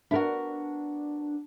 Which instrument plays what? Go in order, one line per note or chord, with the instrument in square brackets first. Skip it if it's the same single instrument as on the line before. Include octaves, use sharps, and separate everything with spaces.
[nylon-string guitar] B3 A#4 [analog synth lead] D4 [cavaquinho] E4 F#4